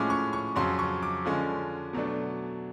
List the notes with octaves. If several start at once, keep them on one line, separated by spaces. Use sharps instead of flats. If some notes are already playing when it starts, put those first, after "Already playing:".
Already playing: A2 F3 G#3 C#4 D6
C#6
C#6
F2 C#3 F#3 C6
C#6
D6
D3 F3 G#3 C#4
B2 F#3 A3 D4